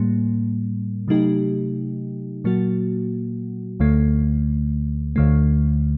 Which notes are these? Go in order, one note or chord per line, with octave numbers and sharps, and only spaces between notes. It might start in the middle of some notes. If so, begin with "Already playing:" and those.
Already playing: A2 G3 A#3
C3 F#3 A3 D#4 G4
A#2 F#3 A#3 F#4
D2 D3 A3
D2 D3 A3